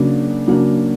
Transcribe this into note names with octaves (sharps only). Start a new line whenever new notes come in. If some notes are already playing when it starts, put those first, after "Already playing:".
Already playing: C#3 F#3 A#3 D4
C#3 F#3 A#3 D4